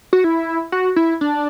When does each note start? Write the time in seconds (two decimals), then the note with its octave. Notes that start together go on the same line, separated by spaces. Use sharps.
0.13 F#4
0.24 E4
0.72 F#4
0.96 E4
1.21 D4